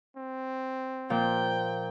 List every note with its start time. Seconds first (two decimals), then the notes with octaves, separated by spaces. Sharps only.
0.17 C4
1.10 A#2 F3 G5